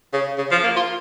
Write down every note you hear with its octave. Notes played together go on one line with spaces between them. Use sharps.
C#3
C#3
F3
A#3
F4